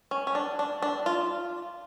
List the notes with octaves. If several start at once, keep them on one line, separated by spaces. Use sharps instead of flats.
C#4
C#4
D4
D4
D4
F4